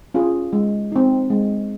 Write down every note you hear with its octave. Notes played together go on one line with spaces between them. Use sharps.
C#4 F4 G#4
G#3
C4 D#4
G#3